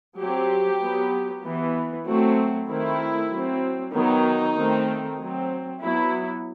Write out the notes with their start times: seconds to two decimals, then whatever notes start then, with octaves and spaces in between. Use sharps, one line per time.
0.19 F#3 C4 G4
0.81 F#3 B3
1.44 E3 B3
2.06 F#3 A3 C4 F#4
2.69 D#3 A3 C4 E4
3.32 F#3 C4
3.94 D#3 F#3 B3 D#4
4.57 D#3 A3 C4
5.19 F#3 C4
5.81 F#3 B3 E4